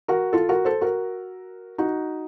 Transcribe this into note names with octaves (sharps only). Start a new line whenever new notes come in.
F#4 A#4
F4 A4
F#4 A#4
A4 C5
F#4 A#4
D#4 F#4